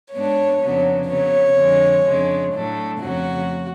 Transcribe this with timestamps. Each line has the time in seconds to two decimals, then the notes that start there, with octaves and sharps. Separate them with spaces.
0.13 G#2 G#3 B3 D4 C#5
0.61 F2 C#3 F#3 B3 D4
1.09 C#3 F#3 B3 C#5
1.57 F2 D3 G#3 D4
2.05 F2 C#3 G#3 D4
2.53 A2 F#3 A3 D4
3.01 F2 C#3 F#3 A3 F#4